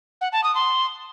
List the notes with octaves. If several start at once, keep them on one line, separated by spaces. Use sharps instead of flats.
F#5
A5
D#6
C6